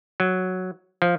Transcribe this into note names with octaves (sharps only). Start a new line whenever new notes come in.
F#3
F3